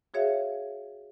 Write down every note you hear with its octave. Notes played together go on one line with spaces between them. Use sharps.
F#4 G#4 C#5 E5 F5